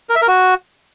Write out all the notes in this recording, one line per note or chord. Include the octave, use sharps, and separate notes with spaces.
A#4
E5
A#4
F#4